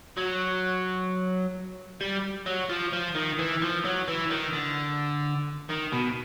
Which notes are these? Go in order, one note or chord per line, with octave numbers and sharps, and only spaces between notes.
F#3
G3
F#3
F3
F3
D#3
E3
F3
F#3
E3
D#3
D3
D#3
B2